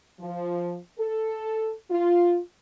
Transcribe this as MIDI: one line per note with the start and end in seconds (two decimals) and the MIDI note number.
0.20 0.77 53
0.99 1.73 69
1.91 2.39 65